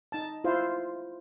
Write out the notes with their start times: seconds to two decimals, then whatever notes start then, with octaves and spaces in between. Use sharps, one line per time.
0.12 D#4 A5
0.44 E4 F4 C5 F5